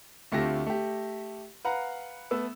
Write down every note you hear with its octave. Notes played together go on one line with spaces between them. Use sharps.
D2 A3 C4 F4 G4 A#6
A3 G4
B4 F5 F#5 A#5
A3 B3 E6